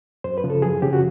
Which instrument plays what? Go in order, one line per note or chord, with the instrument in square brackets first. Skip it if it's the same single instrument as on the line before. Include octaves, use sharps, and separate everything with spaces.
[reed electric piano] F#2 C5
B4
C#3 F3
A4
F#2 G#4
C#3 F3 G4
F#4